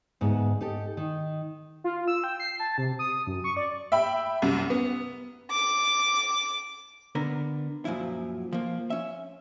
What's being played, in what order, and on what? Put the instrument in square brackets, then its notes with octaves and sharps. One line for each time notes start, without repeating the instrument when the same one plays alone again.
[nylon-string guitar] D2 G#2 B3
D#4 G4 A4
D#3
[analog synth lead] F4
E6
G5
C7
A5
C3
D#6
F#2
C#6
D5
[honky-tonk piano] E5 G5 B5
C2 F#2
B3
[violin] D6
[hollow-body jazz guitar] D3 B3 A#4
F#2 A#2 F3 E4
F3 A#3
C#4 E5